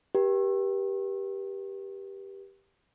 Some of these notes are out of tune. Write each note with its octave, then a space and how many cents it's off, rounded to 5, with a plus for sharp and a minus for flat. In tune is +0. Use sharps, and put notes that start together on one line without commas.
G4 +0 B4 -45